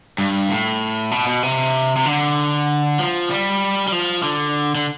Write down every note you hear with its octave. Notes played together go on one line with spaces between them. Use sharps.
G2
A2
B2
B2
C3
C3
D3
F3
G3
G3
F3
D3
D3